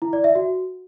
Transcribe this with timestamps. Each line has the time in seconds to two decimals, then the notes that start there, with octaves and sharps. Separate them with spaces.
0.02 E4
0.13 D5
0.24 E5
0.35 F#4